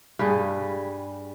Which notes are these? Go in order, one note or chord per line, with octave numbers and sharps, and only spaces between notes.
G2 G3 G#4